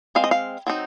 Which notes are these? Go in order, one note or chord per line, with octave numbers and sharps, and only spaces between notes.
G#3 C4 F5
D#5
F5
F#3 C4 D#4